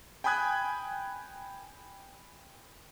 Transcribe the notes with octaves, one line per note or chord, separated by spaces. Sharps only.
G5 G#5 B5 D#6 F#6 G#6